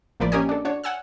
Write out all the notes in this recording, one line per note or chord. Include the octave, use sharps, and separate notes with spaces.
A1 F3 A#3 A#4 B4 D5
A#3 C#4 G4 A#4 D#5 G#5
D4 A4
D4 F#4 C#5
F#5 G#5 E6 F6